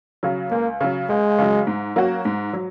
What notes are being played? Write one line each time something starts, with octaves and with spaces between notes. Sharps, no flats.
C#3 F#3
C#2 A#3
C#3 F#3
C#2 G#3
C#3 F#3
G#2
F#3 A#3 C#4 F#4
G#2
F#3